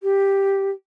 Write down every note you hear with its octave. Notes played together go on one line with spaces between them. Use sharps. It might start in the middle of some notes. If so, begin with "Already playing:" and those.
G4